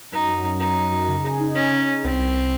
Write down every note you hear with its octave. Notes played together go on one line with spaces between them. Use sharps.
F#2 D#4
F#3
F#2
F#2 D#4
F#2
F#2
C#3
G#4
D#4
C#4 G#4
C#3
D#4
C2 C4
C2